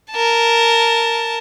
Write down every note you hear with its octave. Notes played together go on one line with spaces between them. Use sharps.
A#4 A5